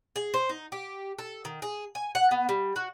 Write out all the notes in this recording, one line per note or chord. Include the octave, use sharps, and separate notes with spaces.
G#4
C5
D#4
G4
A4
D#3
G#4
G#5
F#5
B3
G3
F#4